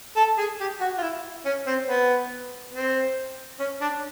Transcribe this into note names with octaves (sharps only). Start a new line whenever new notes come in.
A4
G#4
G4
F#4
F4
E4
C#4
C4
B3
C4
C#4
D4